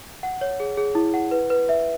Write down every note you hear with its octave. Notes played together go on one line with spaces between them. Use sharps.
F#5
C#5
G#4
G#4
E4
F#5
B4
B4
E5